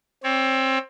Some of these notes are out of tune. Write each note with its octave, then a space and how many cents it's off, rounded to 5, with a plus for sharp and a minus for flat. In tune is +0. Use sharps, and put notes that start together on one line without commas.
C4 +20 C#5 +35